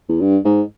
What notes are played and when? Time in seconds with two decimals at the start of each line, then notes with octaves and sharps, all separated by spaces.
0.09 E2
0.21 G2
0.45 G#2